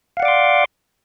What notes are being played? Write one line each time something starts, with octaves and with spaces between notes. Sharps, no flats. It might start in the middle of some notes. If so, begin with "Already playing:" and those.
D5 F5 F#5 C6 D6